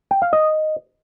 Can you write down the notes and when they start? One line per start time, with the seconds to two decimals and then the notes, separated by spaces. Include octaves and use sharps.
0.11 G5
0.22 F5
0.33 D#5